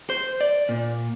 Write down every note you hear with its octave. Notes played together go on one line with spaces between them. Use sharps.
C5
D5
A#2